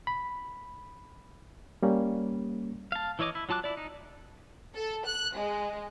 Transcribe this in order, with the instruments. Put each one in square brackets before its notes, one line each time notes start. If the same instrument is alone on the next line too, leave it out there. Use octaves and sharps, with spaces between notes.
[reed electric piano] B5
G3 A#3 C#4
[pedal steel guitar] F5 A5
E3 E4 C#5 D#5 D6
E4
F#3 F4 A5 D6 F#6
E4 D5
D#4
[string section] A4
F#6
G#3